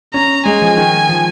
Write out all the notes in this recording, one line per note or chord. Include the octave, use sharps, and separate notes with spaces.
C#4 A#5
G#3 G#5
F3
D#3
F3